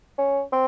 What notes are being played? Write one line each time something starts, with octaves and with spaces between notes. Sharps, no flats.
C#4
C4